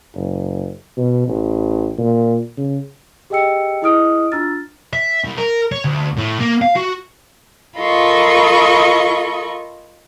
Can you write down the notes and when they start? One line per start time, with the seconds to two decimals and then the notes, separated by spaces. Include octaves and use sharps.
0.15 F#1
0.98 B2
1.28 A1
1.98 A#2
2.58 C#3
3.30 G4 G#4 D#5 G5 E6 C#7
3.82 E4 G#4 D#5 D#6 F6 D7
4.32 D4 F4 A#5 E6 F6 A6
4.93 E5
5.24 C2
5.38 A#4
5.72 C#5
5.85 D2
6.17 A2
6.40 A#3
6.62 F5
6.76 F#4
7.78 F4 A4 A#4 D#5 B5 C#6